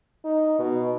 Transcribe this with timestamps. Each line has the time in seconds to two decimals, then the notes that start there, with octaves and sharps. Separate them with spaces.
0.25 D#4
0.59 B2